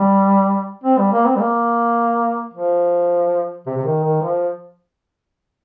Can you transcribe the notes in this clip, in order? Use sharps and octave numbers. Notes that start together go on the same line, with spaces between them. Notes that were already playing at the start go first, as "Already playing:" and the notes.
Already playing: G3
C4
G3
A#3
C4
G3
A#3
F3
C3
C3
D#3
D#3
F3